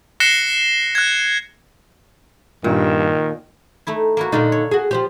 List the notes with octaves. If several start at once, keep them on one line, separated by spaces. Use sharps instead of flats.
F#6 A#6 C7 C#7 E7 G7
F#6 G#6
G2 A#2 D#3
A3 D#4 E4
A#3 E4 F#4
A#2 D3 A#3 D4 D#4 F4
C#5
F#4 G#4
F3 C4 G4